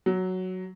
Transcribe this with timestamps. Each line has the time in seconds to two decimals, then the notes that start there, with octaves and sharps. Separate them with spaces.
0.06 F#3